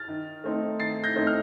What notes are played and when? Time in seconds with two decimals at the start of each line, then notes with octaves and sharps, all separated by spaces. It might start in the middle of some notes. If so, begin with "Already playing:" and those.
Already playing: F6 A6
0.08 D#3
0.44 A3 C4 D#4
0.80 D#3 A6 C7
1.04 G6 A#6
1.16 A3 C4 D#4
1.27 F6